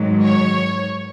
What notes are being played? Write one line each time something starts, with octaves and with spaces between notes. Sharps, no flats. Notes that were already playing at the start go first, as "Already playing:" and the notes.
Already playing: G#2 D#3 F#3
C#5